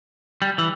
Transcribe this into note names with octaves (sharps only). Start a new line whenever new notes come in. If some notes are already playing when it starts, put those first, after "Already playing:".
G3
E3